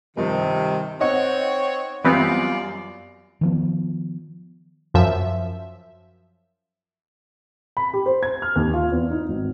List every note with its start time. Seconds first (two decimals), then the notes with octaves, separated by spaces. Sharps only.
0.17 G2 C3 D#3 F3
1.00 C4 D#4 C#5 D#5 F#5
2.04 F#2 E3 G3 B3 C4 F4 D5 F5
3.41 D#3 F3 B3
4.94 F#2 F3 E5
7.77 B5
7.94 G4
8.06 C5
8.23 G#6
8.42 F6
8.56 D#2
8.74 F4
8.92 E2
9.10 D#4
9.29 G#1